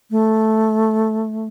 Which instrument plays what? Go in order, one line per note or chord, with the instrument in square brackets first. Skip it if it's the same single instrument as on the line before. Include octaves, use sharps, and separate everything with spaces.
[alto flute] A3